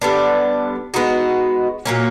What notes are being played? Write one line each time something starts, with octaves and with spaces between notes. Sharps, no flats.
D3 G3 B3 D4
G#3 B3 D#4 F#4
A#2 F#3 A#3 C#4